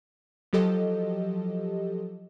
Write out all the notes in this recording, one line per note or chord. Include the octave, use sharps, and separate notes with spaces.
F3 F#3 G4 A4 D#5